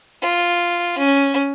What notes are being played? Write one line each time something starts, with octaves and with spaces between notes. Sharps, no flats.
F4
C#4